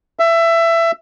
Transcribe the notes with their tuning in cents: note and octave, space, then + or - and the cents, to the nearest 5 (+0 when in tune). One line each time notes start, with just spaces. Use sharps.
E5 +20